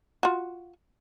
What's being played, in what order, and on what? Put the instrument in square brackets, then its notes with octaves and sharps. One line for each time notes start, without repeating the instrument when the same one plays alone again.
[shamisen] F4 F#4